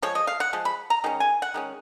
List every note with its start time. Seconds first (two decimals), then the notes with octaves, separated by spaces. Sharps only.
0.02 F3 G#3 C#5
0.15 D#5
0.27 F5
0.40 F#5
0.53 F3 G#3
0.65 B5
0.90 A#5
1.04 D#3 G#3 C#4
1.20 G#5
1.42 F#5
1.54 D#3 G#3 C#4